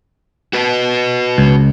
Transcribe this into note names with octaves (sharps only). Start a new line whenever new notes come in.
F#4 B4
C#2